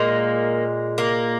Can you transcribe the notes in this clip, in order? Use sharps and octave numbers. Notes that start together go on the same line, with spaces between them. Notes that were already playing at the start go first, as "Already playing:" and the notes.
Already playing: A#2 G#3 A#3
A#3